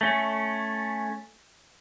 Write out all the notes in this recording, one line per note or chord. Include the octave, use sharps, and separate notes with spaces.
A3 C#4